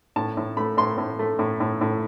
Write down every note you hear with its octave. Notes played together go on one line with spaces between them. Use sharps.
A2 A5
A2
A3 B5
A2 C6
A2
A3
A2
A2
A2